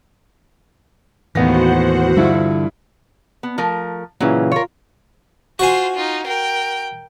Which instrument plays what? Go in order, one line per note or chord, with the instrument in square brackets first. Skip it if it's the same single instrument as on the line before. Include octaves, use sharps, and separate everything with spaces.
[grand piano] D#2 B3 A#6 [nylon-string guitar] A2 E3 [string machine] F#4 C5 F#5
[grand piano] G2 E4 F4 [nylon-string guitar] D3
[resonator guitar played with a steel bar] B3
F3 A3 A#4
[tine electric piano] A#2 C#3 E3 [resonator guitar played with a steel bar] F#3 C#4
[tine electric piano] F4 [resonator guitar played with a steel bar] A#4 C#5
[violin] F4 C5 [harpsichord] F#4 G#5
[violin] D#4 F4
A#4 G5